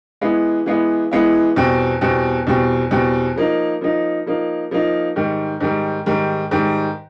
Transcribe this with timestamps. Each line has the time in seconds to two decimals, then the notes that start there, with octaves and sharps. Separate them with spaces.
0.21 E3 G#3 B3 E4
0.66 E3 G#3 B3 E4
1.11 E3 G#3 B3 E4
1.56 E2 B2 G3 C4
2.01 E2 B2 G3 C4
2.47 E2 B2 G3 C4
2.91 E2 B2 G3 C4
3.36 F3 A#3 D#4
3.81 F3 A#3 D#4
4.26 F3 A#3 D#4
4.71 F3 A#3 D#4
5.16 G#2 D#3 G3
5.60 G#2 D#3 G3
6.06 G#2 D#3 G3
6.51 G#2 D#3 G3